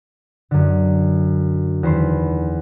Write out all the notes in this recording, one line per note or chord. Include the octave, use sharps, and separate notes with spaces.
F#2 D3
E2 D#3 C5 B5 C6